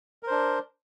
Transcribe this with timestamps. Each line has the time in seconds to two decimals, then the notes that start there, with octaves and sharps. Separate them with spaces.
0.23 A#4
0.27 C5
0.31 D4